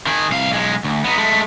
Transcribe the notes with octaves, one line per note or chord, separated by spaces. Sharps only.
D#3 G#4
C2 F5
B1 G#3
D2
B3 D#4
G#3 A3